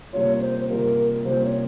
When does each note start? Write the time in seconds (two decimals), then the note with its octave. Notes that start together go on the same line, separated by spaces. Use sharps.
0.13 C3 G3 A#3 C#4 F4 C#5
0.41 C5
0.69 C3 G3 A#3 C#4 F4 A#4
1.25 C3 G3 A#3 C#4 F4 C5
1.44 C#5